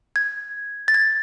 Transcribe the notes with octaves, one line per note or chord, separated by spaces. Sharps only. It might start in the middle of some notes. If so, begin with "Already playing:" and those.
G#6
A6
G#6